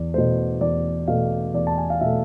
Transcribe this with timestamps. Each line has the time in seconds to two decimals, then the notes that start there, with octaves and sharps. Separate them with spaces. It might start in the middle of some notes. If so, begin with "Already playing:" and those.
Already playing: E2 D5
0.14 B2 A3 C5
0.61 E2 D5
1.08 B2 A3 F5
1.54 E2 D5
1.67 A5
1.78 G#5
1.90 F5
2.01 B2 A3 E5